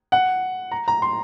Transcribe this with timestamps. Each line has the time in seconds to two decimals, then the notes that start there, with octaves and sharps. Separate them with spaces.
0.12 F#5
0.71 A#5
0.88 A#5
1.02 C6